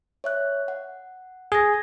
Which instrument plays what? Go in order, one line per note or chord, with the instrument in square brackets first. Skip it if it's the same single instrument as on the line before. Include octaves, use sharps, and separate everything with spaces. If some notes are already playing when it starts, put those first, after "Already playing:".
[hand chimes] C#5 E5 F#6
F#5
[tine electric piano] G#4 [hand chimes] G#6 A#6